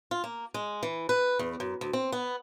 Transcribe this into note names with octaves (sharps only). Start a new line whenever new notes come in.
F4
A#3
G#3
E3
B4
E2
F#2
D2
C4
B3